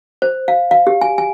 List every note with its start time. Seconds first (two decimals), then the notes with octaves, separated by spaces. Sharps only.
0.22 C5
0.48 F5
0.71 F5
0.87 G4
1.01 G#5
1.18 G#5